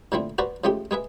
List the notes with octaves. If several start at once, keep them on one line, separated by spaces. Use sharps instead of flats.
A#2 D3 F3 A3 C4 E4
F#4 B4 C5 D5 A5 A#5
C#3 F3 G#3 A3 G4
G#3 G#4 B4 E5